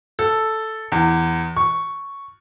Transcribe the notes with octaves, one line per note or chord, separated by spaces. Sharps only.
A4
E2
C#6